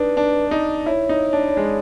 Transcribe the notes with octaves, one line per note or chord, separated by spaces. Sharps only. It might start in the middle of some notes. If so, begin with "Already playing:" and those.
Already playing: D4 D#4 B4
D4
D#4
E4 C#5
D#4
D4
G#3